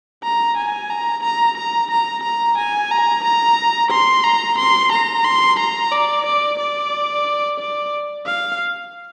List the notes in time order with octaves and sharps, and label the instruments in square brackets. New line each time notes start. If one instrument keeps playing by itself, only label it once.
[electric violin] A#5
G#5
A#5
A#5
A#5
A#5
A#5
G#5
A#5
A#5
C6
A#5
C6
A#5
C6
A#5
D5
D5
D5
D5
F5